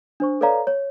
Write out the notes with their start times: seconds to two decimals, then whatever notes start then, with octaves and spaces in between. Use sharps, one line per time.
0.20 D4 C5 C#6
0.41 A4 B4 C#5 D5 F5 A#5
0.67 C#5